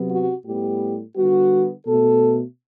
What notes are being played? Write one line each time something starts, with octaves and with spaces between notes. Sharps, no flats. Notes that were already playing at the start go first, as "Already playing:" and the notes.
Already playing: C3 F#3 B3
F#4
A2 G3 B3 G4
D3 G3 B3 F#4
B2 A3 A4